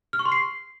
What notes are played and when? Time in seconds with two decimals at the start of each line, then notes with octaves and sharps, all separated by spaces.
0.13 F6
0.19 C#6
0.25 C6
0.32 C7